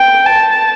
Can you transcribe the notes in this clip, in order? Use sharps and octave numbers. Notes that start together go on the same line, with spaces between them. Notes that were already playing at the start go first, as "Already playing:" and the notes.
Already playing: G5
A5